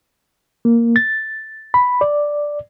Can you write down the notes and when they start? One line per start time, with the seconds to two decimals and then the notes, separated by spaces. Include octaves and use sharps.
0.65 A#3
0.96 A6
1.74 B5
2.01 D5